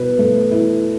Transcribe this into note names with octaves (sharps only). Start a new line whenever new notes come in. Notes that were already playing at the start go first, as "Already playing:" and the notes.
Already playing: B2 B4
A3
E4